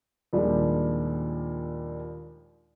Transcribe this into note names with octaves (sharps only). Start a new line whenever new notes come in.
D#2 A#2 F3 G3 G#3 D4